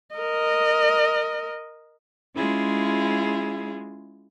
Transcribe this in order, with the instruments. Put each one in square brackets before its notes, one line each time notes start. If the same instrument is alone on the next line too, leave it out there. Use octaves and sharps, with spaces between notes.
[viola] A#4 D#5
[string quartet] G#3 C#4 E4 F4 G#4